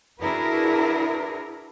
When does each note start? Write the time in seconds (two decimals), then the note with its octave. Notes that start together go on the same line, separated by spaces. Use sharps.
0.21 D4 E4 F#4 G#4 A#4 B4